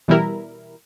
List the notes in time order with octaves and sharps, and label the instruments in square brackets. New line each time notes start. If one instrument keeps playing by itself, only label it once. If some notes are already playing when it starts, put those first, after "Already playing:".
[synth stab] B2 E3 G3 E4 A#4